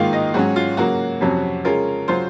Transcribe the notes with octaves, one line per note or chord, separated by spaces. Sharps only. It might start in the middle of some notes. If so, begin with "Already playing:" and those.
Already playing: G#2 D#3 A#3 F4 F5
D#5
G#2 F#3 C#4 F#4
F4
C#3 F#3 A#3 F#4
F2 C3 F#3 C#4
C#3 G#3 C#4 F4 A#4
C#3 F#3 C#4 F4 C5